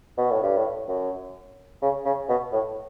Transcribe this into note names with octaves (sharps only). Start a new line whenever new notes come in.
B2
A2
G2
A2
F#2
C#3
C#3
B2
A2